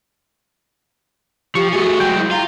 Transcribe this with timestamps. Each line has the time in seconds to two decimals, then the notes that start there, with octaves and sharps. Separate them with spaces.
1.55 F3 G4 C#6
1.73 A3 F#4 G#4
2.00 F#3 G#3 G5
2.19 E4
2.31 F4 A#5